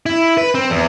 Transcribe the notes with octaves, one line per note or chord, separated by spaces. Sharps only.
E4
B4
C4
E2